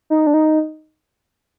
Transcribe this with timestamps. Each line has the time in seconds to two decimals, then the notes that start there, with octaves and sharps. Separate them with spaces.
0.10 D#4
0.27 D4
0.34 D#4